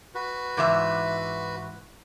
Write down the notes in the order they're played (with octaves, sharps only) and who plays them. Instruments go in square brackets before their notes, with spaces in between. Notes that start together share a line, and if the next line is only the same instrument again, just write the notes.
[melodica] F#4 B4
[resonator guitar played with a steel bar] G#2 E3 E5